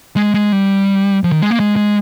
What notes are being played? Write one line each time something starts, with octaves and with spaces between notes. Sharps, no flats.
G#3
G#3
G3
F3
D#3
G#3
A#3
G#3
G#3